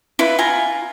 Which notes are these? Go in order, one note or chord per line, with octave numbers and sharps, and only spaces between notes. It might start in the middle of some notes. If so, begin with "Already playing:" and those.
E4 F4 B4
F4 G#5 A#5